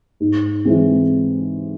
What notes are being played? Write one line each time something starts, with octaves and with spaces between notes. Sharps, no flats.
G#2
E3 G#3 C4